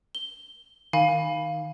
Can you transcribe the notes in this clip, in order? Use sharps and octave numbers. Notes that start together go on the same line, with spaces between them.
G7
D#3 F5 G#5 B5